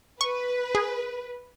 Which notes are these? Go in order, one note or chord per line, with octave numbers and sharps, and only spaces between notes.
B4 C#6
G#4